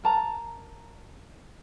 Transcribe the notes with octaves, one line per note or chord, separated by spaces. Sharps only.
A#4 A5 A#5